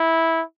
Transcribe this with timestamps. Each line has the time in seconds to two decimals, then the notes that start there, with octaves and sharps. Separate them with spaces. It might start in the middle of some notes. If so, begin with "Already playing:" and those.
Already playing: E4